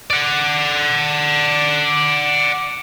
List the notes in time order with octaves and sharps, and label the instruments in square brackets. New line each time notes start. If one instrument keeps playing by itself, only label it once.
[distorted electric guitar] D5 F#5